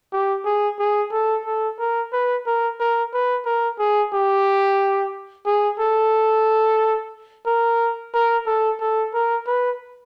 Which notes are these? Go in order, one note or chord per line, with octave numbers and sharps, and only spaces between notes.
G4
G#4
G#4
A4
A4
A#4
B4
A#4
A#4
B4
A#4
G#4
G4
G#4
A4
A#4
A#4
A4
A4
A#4
B4